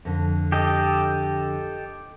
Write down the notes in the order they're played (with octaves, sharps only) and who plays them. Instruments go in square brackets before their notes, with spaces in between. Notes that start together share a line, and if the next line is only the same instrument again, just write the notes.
[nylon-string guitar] F2 D3
[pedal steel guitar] G4 A4 D#5